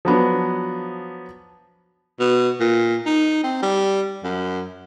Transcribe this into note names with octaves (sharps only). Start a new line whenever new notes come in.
F3 F#3 B3 D4
B2
A#2
D#4
C4
G3
F#2